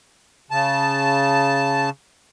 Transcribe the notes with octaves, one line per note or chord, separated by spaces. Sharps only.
C#3 A5